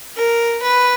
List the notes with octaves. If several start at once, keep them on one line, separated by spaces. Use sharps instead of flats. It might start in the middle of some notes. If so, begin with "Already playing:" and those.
A#4
B4